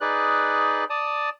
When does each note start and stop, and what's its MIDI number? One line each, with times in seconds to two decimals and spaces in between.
0.01 0.84 63
0.01 0.84 68
0.01 0.84 71
0.01 0.84 74
0.01 0.84 90
0.90 1.30 74
0.90 1.30 81
0.90 1.30 87